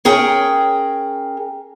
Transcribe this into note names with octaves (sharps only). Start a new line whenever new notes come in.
C#4 G#4 A#4 G5